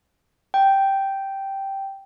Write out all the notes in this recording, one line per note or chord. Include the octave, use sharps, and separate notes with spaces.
G5